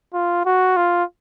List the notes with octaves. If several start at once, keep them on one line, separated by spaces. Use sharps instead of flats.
F4
F#4
F4